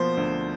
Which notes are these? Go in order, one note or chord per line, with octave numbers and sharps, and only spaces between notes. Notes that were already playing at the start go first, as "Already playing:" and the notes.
Already playing: B2 F3 A#3 C5
D2